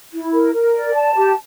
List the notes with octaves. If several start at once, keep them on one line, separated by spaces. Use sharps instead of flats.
E4
A#4
A#4
D5
A5
G4